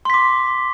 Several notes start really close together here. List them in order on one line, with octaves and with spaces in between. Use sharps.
C6 B6 D6